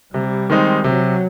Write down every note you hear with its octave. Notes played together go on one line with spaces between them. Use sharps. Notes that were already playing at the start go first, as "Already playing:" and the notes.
C3 G3
D#3 G#3 C4 D#4
C3 F#3